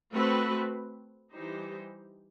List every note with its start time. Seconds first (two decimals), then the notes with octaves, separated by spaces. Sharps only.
0.12 A3 C4 F#4 B4
1.33 E3 G3 D#4 G4 C5